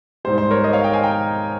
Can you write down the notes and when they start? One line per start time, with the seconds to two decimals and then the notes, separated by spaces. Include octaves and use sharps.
0.25 G#2 G3 C5
0.38 C5
0.51 A#4 C#5
0.64 C5 D#5
0.73 C#5 F5
0.84 D#5 G5
0.93 F5 G#5
1.04 G5 A#5